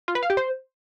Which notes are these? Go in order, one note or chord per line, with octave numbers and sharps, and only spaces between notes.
F4
B4
F5
G4
C5